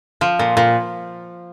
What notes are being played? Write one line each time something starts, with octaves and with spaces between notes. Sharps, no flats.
F3
A#2
A#2